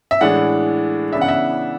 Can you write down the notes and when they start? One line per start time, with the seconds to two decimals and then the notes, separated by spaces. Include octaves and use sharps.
0.11 E5
0.21 A2 E3 G#3 D4 F#5
1.13 C#3 E3 B3 D4 E5
1.21 F#5
1.28 E5